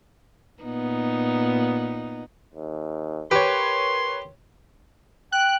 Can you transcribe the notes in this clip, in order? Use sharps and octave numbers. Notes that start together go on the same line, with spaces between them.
A#2 B3 D#4
D#2
G4 A#4 B4 C#5 C6
G5 F#6